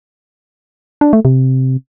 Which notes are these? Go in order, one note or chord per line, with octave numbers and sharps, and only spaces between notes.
D4
A3
C3